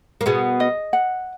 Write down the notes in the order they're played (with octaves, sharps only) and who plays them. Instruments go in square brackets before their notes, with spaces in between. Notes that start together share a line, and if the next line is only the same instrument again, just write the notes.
[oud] A#3
[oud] B2 B3 [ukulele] G#4
[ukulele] D#5
F#5